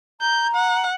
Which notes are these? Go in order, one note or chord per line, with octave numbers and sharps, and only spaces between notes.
A#5 G6
F#5